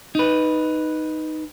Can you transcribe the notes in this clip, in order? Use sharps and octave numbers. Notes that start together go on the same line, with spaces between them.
D#4 B4